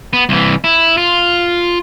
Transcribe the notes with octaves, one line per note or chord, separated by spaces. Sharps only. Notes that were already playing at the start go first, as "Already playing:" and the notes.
B3
C2 E3
E4
F4